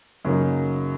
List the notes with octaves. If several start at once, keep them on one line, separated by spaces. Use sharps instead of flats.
F#2 C#3 F#3 A#3 D#4